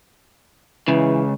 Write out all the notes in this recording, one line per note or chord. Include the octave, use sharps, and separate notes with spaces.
C#2 C#3 E3